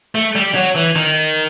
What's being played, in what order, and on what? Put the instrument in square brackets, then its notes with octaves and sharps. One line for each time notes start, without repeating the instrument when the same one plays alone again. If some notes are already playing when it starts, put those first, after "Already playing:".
[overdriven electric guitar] A3
G3
F#3
E3
D#3